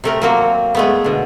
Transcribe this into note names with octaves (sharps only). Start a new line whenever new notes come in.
C3 A3 A#4
F#3 A#3 C4
G#3 A3 B3
B2 D3